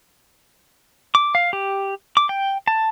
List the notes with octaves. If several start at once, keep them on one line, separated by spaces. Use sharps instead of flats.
D6
F5
G4
D6
G5
A5